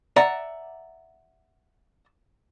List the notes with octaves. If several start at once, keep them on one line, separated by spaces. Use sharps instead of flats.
D5 E5 F#5 A#5